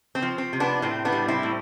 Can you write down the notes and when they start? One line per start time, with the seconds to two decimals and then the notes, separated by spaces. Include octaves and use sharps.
0.15 C4
0.22 F3
0.38 C4
0.53 C3
0.60 B3 D4
0.82 A2 C4
1.05 B3 D4
1.12 G3
1.28 C4 E4
1.43 A2